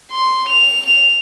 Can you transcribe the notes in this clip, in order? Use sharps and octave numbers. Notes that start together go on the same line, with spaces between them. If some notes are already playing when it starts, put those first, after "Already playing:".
C6
F7
F7